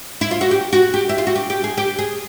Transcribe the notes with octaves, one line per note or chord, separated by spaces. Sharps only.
E4
F4
F#4
G4
F#4
G4
E4
F4
F#4
G4
G4
G#4
G4
G#4